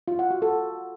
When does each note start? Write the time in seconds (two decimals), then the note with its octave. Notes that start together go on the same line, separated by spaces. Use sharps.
0.08 F4
0.19 F#5
0.30 F#4
0.42 A4